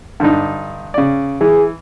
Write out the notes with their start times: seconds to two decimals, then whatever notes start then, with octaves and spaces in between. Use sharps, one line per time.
0.20 G2 D3 D#4
0.94 C#3 D5
1.41 E3 G#4